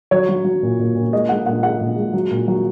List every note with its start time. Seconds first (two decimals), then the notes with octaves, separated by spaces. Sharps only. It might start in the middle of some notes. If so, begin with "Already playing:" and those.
0.11 F#3 C#5
0.29 F#3
0.45 F#3
0.63 A#2
0.79 A#2
0.95 A#2
1.12 G#3 D#5
1.29 G#3 F#5
1.46 A#2 F#5
1.63 G#3 F#5
1.81 A#2
1.97 G#3
2.13 F#3
2.31 A#2
2.48 F#3